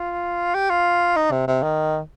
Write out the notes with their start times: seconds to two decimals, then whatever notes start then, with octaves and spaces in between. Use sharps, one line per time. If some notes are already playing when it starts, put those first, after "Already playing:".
Already playing: F4
0.55 G4
0.70 F4
1.16 D#4
1.32 C3
1.48 C3
1.63 D#3